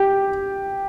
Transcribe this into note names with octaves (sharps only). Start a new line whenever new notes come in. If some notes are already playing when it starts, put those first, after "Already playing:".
Already playing: G4